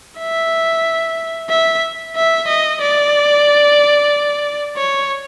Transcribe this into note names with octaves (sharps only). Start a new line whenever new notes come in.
E5
E5
E5
D#5
D5
C#5